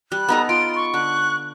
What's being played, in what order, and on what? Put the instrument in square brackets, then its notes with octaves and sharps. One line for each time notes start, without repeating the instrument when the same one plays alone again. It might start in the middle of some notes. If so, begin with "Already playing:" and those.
[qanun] G3 [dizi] F#6
[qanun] B3 D#4 A4 [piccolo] A#5
[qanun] F4 [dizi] C6 [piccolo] D7
[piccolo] C#6
[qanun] D3 [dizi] F#6